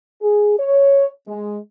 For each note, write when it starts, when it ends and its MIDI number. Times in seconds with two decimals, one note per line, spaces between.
0.22 0.56 68
0.59 1.07 73
1.28 1.58 56